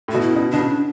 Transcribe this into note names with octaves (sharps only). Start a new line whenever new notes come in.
A2
B2 F#4
E4
C#3
B2
B2 D4
C#3